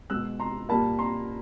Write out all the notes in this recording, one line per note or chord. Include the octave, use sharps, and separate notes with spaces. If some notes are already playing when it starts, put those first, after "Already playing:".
B2 G#3 E6 F#6
A#5 C6
A#2 G3 A#3 A5 B5
A#5 C6